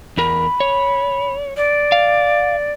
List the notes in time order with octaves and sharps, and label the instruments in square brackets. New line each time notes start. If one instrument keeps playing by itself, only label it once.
[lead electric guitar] E2 A#4 [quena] B5
[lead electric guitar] C#5
[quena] D5
[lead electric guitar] F5